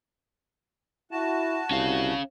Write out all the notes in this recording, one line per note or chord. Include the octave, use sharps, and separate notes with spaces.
E4 F#4 A5
C2 C#4 F5